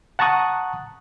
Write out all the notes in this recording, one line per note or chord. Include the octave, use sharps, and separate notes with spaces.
F#5 A5 A#5 C#6 D#6 F#6